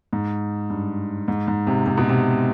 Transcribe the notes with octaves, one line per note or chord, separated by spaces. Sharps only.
G#2
G2
G#2
G#2
C3
C3
B2
C3